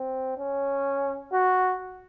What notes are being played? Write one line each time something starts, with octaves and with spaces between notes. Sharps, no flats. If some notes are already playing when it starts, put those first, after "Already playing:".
Already playing: C4
C#4
F#4